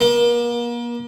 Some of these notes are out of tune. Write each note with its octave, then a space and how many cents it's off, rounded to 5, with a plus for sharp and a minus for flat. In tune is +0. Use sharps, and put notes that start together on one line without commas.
A#3 +40